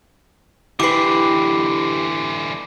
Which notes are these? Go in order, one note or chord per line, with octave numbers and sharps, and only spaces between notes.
D3 E3 E4 G4 B4 D6 C7